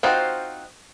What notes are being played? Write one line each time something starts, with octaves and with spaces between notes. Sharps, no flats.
C4 D#4 F4 F#4 C5